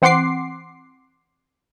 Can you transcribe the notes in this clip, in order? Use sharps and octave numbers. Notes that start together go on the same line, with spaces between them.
E3 C4 F#5 C6 D6 C7